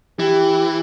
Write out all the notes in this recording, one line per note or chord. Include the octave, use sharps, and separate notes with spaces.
E3 G4